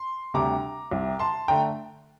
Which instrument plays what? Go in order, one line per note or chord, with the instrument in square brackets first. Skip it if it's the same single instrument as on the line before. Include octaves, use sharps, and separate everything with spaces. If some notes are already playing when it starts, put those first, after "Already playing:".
Already playing: [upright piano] C6
D2 C3 G3 D4 A#5 D6
C2 C3 G3
A5 C6
D3 A3 G5 A#5